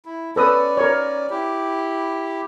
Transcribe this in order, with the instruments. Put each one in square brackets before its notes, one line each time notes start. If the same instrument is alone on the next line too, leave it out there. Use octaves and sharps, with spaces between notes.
[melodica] E4
[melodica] C#4 D5 [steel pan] A4 B4 D#6
[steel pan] A#4 C#5
[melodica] E4 G4